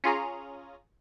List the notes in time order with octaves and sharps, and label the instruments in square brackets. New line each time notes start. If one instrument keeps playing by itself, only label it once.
[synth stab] C#4 F4 G#4 A#5